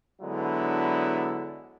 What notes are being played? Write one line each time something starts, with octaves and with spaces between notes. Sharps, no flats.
D3 F#3 G#3 B3 D4 E4